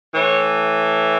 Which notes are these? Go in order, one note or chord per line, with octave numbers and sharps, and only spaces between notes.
A2 E3 C#5